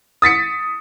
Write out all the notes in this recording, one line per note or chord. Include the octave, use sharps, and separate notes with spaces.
D#6 A6 B6 C#7